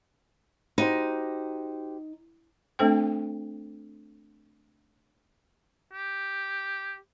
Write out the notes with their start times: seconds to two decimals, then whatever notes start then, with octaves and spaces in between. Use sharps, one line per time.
0.78 D#4 F#4 G4 C5
2.79 A3 C4 D4 A4 C5 G5
5.93 G4